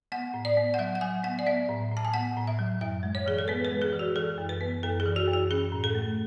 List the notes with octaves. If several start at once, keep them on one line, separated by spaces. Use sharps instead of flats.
B3 F#5
A2
D5
B3
F#5
F#3 E5
F#5
F#3 G#5
B3 F#5
D5
B3 E5
A2
A2
A5
G#5
B3 F#5
A2
E5
F#3
F#2 E5
G#3
C#5
E3 G#4
A4
B3 B4
B4
G#3
G#4
E3
F#4
E3 A4
F#2
B4
B3
F#2 A4
G#4
E3
F#4
F#2
F#4
C#4 G#4
A2
A4
A3